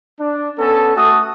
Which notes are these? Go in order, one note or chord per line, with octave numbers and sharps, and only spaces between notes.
D4
B3 C#4 A4
A3 F#4 A5 D#6